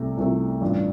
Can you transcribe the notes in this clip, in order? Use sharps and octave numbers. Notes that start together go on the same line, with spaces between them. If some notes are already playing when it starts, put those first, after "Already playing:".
Already playing: C2 C3 A3
C2 C3 A3 F4
A1 G2 F3 D4